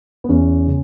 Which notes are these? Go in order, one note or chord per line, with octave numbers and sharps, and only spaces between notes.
B3
E2 C#4
C#3